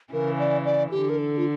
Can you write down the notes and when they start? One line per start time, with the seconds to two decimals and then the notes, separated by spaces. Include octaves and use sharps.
0.13 C#3 E3 A#4
0.39 D5
0.65 D5
0.91 D3 G4
1.09 A#4
1.18 A4
1.38 F4